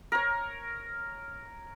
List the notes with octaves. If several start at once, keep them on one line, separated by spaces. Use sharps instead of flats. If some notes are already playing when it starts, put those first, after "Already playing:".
A#4 C#5